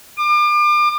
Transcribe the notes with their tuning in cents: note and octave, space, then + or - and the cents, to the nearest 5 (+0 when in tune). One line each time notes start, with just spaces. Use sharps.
D6 +35